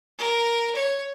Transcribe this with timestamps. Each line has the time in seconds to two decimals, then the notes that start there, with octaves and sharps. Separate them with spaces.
0.19 A#4
0.75 C#5